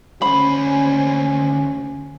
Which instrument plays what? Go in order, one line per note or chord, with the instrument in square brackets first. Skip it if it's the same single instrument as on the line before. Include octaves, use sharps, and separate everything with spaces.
[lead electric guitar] D2 C5 [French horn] C#4 [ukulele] B5